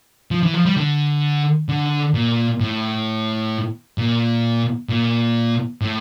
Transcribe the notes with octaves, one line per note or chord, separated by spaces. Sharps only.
F3
E3
F3
G3
D3
D3
A#2
A2
A#2
A#2
A2